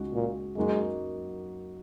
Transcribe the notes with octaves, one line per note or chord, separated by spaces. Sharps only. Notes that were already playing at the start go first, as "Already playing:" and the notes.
Already playing: C#2 C#3 G#3 D#4 F#4
A#2
F#2 F#3 G#3 A#3 D#4 F#4